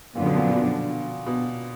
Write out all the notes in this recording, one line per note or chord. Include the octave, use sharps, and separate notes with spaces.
F#2 A#2 D3 F3 B3 D4
B2
A#2
B2
B2